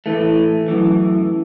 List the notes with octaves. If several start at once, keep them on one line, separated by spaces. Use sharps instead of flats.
A2 E3 A3
F#2 E3